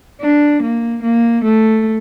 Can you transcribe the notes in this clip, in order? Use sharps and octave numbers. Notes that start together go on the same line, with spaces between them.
D4
A#3
A#3
A3